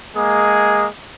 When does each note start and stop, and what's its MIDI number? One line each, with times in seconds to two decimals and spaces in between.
0.16 0.86 56
0.16 0.86 58
0.16 0.86 68